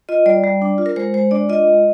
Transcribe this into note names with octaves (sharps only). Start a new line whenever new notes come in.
F4 D#5
G3 D5
G3
D4
F4
A#4
G#3 C5
G#3 C5
D4 D5
F4 D#5
G#3